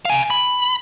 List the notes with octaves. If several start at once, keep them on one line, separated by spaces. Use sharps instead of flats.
F5 G#5
B5